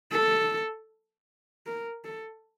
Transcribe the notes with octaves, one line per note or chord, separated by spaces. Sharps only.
A4
A#4
A4